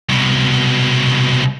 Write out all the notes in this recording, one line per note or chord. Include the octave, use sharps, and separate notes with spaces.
C2 B2